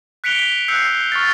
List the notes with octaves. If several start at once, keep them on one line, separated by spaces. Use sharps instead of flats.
F#6 B6 C#7 D7 F7 G7
B6
E6 F#6 G6 C7 C#7
C#6 F6 A6